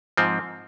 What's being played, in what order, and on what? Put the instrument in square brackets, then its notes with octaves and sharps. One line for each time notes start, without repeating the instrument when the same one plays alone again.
[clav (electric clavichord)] G#2 F3 C4